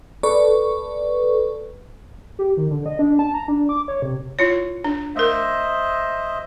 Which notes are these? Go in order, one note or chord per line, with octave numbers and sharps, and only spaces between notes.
A4 B4 D5 C#6
G4
D#3
D3
D#5
D4
A5
A#5
D4
D6
C#5
C3
E4 F4 C#5
D4
A3 A#4 C5 D#5 E5